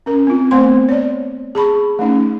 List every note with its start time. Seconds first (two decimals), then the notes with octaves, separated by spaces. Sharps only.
0.06 C#4 A#4
0.27 C4 F4
0.51 A3 B3 C4 C5 G5 C6
0.89 C#5 D5
1.55 G#4 A5 B5 C#6
1.99 A3 C#4 D#4